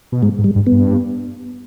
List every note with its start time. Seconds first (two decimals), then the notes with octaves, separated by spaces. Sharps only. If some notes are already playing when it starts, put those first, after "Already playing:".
0.12 B2
0.22 G#2 G#3
0.38 G#2
0.44 G3
0.56 G2
0.67 B3
0.72 G2